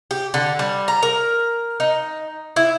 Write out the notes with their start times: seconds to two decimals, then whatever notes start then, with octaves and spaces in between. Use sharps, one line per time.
0.11 G4
0.34 D3
0.59 G3
0.88 A#5
1.03 A#4
1.80 D#4
2.56 E4